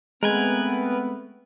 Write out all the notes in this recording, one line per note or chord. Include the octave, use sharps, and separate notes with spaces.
G#3 A3 B3 C4 A#4 B4 G#5